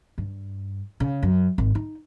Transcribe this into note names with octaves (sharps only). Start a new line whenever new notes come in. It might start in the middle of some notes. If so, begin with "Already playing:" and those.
G2
C#3
F#2
G#1
D#4